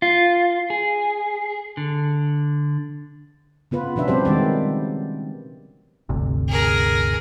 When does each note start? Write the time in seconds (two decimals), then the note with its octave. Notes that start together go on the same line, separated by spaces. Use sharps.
0.02 F4
0.70 G#4
1.77 D3
3.71 C#3 B3 F4 B4
3.96 B2 F3 C#4 D4 B4 E5
4.08 G3 B3 C4 G4 C5
4.25 D#3 G3 G#3 G4 D5
6.09 G1 D2 C3
6.49 G#4 A#4